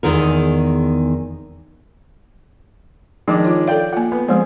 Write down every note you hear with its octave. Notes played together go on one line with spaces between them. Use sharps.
E2 D#3 G#3 A#4
D#3 F3 G#3 D4 D6
F4 C#5
A4 D5 F5 G5
A#3 F4 F#5
B3
F3 G#3 C4 G#4